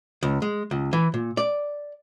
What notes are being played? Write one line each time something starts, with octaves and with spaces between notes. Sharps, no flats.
C#2
G#3
C#2
E3
A#2
D5